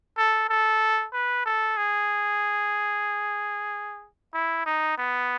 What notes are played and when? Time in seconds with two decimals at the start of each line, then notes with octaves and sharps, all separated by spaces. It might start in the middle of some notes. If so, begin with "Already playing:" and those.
0.18 A4
0.49 A4
1.13 B4
1.46 A4
1.77 G#4
4.33 E4
4.66 D#4
4.98 B3